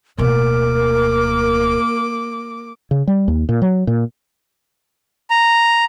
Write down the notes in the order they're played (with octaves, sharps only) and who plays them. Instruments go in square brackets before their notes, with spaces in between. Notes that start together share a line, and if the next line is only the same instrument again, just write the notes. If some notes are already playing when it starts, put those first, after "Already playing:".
[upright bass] D1 B2 [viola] A#3 D6 [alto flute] A#4
[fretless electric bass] C#3
G3
D#2
A#2
F#3
A#2
[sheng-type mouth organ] A#5